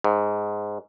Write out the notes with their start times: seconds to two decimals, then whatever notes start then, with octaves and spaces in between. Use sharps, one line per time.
0.04 G#2